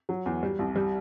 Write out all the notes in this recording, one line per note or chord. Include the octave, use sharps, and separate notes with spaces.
F#3
E2
G3
C2
G3